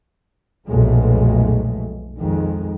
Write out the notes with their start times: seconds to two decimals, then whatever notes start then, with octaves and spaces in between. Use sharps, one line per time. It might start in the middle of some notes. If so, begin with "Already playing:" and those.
0.66 B1 F2 A#2 G#3 A3
2.19 F2 D#3 G#3